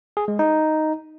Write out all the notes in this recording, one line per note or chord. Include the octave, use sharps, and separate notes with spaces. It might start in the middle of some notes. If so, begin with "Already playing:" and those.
G#4
G#3
D#4